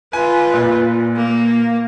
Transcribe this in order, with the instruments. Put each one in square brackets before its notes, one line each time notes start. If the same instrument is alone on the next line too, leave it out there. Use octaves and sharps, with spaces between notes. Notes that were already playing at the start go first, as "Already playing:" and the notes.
[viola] F4 B4 [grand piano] G#5
[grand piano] A#2
[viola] A#3